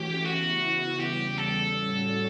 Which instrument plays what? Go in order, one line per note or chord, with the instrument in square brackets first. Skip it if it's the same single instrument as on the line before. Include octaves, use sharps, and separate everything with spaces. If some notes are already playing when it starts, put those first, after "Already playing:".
Already playing: [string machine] E3 A3 C#4 F#4 C#5 [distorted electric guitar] G4
[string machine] C#3 E3 B3 E4 [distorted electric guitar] F#4
[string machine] E2 C#3 G3 [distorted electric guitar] G4
[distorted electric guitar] A4
[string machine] A2 G3 C#4 F#4 C#5